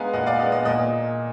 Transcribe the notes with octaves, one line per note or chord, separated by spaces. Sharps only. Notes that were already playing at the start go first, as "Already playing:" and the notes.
Already playing: G#3 B3 F5 G#5 A#5
A#2 D#5 F#5
D5 F5
G#3 B3 D#5
D#5
A#2 D#5